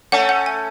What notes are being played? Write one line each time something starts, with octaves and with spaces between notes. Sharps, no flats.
A3 C#4 F#5
F#5
G#5